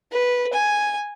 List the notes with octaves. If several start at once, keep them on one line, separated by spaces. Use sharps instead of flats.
B4
G#5